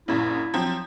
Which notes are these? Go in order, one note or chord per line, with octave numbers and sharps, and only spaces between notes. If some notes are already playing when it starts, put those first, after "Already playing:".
A#1 F#2 A#2 E4
F3 F#3 C4